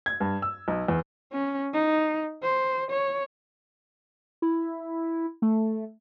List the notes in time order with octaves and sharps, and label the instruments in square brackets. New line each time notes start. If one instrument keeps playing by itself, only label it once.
[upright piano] G#6
G2
E6
B1
E2
[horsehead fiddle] C#4
D#4
C5
C#5
[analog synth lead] E4
A3